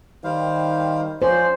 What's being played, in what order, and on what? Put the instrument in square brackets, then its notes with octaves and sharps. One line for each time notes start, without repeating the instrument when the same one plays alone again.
[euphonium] D#3 [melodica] G3 C5 F5
[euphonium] F3 [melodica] C#4 D5 [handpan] C5